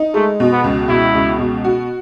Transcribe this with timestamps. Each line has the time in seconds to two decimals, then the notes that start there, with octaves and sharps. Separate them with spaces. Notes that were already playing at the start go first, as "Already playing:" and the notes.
Already playing: D#4
0.14 G#3 A3
0.40 B2
0.52 B3
0.64 C#2
0.89 B2 E4
1.15 C#2
1.39 B2
1.64 F#4